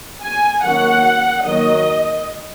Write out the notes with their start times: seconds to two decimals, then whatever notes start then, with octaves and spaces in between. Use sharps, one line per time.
0.23 G#5
0.63 D#3 F#3 A#3 C#4 F#5
1.45 D#3 F#3 A#3 D#5